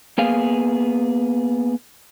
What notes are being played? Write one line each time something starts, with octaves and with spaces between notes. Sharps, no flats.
A#3 B3 G#4 F5